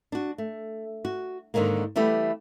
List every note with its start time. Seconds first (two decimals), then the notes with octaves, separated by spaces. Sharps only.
0.12 D4 F#4
0.38 A3
1.05 F#4
1.54 G#2 D3 D#3 G#3 A#3
1.96 E3 G3 A3 B3 G4